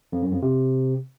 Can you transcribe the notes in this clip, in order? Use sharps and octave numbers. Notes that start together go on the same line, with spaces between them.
F2
F#2
F2
C3